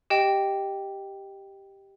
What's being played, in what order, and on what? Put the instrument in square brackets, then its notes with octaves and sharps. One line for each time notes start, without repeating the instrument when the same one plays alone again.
[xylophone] G4 D#5 G5